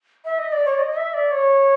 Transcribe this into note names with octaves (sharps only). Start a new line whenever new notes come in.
E5
D#5
D5
C#5
D5
D#5
D#5
E5
D5
C#5